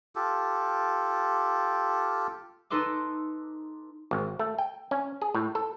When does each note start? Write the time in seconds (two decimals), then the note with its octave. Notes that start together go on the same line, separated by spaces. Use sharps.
0.15 F4 G4 A4
2.70 D#4 A4 B4 C6 D6
4.11 G#1
4.39 A3
4.58 G5
4.91 C#4
5.22 G#4
5.35 A2
5.55 A4